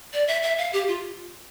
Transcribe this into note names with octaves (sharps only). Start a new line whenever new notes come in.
D5
E5
E5
F5
G4
F4